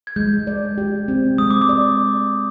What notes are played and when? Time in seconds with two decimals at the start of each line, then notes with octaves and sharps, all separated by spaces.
0.07 G#6
0.16 G#3 G6
0.47 D5
0.78 G4
1.08 C4
1.38 G#3 D#6
1.50 D6
1.61 D#6
1.69 D5